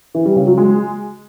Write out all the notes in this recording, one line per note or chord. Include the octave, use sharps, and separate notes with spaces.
E3
G3
C#3
F#3
G#3